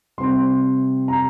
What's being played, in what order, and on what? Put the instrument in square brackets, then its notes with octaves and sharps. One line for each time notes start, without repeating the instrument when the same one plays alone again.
[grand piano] C3 G3 C4 C6
A#5